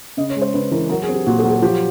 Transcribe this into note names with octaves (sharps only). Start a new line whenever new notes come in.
C#3 D#5
C#5
G#3
C5
C#3 B4
E3 A#4
F#3 A#4
G#4
C4
G4
A#2 F#4
A4
F#3
A4
F3 G4